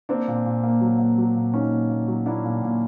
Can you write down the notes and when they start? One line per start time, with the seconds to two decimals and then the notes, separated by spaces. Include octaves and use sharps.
0.09 A#3 C4 D4
0.28 A#2
0.46 A#2
0.63 A#3
0.81 F#3
0.99 A#3
1.18 F#3
1.35 A#2
1.53 A#3 C#4 D#4
1.71 A#2
1.90 A#3
2.08 F#3
2.26 A#3 D4 E4
2.44 A#2
2.62 A#2